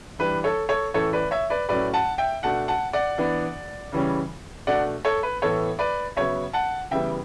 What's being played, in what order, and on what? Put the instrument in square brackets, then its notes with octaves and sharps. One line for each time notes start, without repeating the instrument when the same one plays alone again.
[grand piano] E3 G3 D4 B4
A4 C#5
A4 C#5
A2 E3 A3 C#4 A4 C#5
B4 D5
C#5 E5
B4 D5
A2 F#3 A3 C#4 B4 D5
F#5 A5
E5 G5
B2 A3 D4 F#5 A5
F#5 A5
D5 F#5
E3 B3 D4
C#3 E3 G3 C#4
B2 A3 D4 D5 F#5
A4 C#5
B4
A2 E3 B3 A4 C#5
B4 D5
C#3 F#3 B3 C#5 E5
F#5 A5
C#3 E3 G3 B3 E5 G5